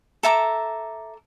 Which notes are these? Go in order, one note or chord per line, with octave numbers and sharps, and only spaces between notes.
A4 E5 A#5 D6